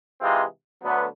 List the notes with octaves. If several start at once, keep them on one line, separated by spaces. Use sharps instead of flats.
C3 E3 G#3 C4 F4
D2 D3 F#3 B3